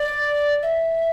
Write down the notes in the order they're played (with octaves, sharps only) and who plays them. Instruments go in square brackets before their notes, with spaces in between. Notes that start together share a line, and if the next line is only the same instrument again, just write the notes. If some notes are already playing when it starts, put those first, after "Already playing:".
Already playing: [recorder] D5
E5